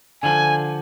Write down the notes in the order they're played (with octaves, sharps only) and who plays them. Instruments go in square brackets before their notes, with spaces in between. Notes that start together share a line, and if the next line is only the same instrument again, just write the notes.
[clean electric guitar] D3 F3 [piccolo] G#5